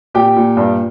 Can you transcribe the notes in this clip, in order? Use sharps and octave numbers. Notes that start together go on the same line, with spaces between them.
A#2 G4 G5
A#2
G2